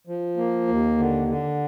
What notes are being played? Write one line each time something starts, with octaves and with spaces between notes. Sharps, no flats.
F3
A#3
D#2
D3
D3